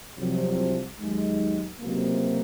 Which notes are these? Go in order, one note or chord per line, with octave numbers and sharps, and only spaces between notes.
C2 C3 F3 F#3
D#2 D#3 F#3 G#3
C#2 C3 F#3 A#3